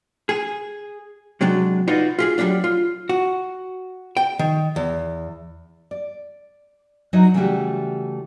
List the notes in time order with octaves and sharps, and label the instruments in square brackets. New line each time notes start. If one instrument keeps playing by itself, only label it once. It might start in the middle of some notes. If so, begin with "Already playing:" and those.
[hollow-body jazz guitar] G#4
C3 F#3 G#3 D4
D#4 F4 F#4 B4 D5 D#5
F4 G4 G#4
F#3 G3 C#4 D4 F4
F4
F#4
G5
D#3
E2
[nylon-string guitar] D5
F#3 D#4 E4 F#4 C#5 D#5
C#3 E3 G3 A3 F#4 G4